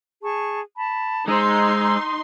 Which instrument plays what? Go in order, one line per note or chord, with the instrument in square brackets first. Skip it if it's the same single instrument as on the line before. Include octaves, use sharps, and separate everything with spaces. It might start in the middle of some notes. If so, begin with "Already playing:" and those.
[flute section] G#4 A5 C#6
A5 B5
[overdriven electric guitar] G#3 [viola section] D#4 C6 [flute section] C5 A#5 E6